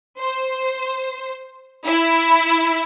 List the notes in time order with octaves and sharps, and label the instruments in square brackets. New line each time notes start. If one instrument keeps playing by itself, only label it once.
[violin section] C5
E4